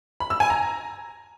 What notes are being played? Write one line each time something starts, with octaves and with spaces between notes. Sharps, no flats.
B5
E6
G#5
A#5